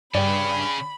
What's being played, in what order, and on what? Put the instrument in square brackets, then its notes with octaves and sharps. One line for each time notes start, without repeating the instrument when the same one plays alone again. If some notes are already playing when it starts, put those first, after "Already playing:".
[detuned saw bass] G2 [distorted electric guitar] C#3 C#4 [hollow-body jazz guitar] D5 G5 [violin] B5